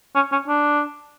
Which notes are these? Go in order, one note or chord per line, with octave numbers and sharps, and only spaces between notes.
C#4
C#4
D4